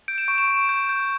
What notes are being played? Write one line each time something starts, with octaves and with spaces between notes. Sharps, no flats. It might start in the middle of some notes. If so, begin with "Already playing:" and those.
G6 D7
E7
C#6 D7
E7
C#6
G6
G6